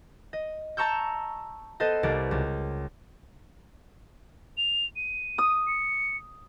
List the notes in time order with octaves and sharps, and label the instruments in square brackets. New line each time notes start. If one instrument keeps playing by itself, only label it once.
[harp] D#5
A5 A#5 C#6 E6 G6
B3 A4 C5 D#5
C2 A#4 D5 D7
C#2
[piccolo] F7
D#7
[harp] D#6
[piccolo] C#7